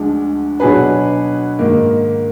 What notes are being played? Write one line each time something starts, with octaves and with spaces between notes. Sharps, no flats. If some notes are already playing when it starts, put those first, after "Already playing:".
Already playing: D2 D3 F3 G#3 D4
B2 F#3 D4 G#4 B4
G#2 D#3 A#3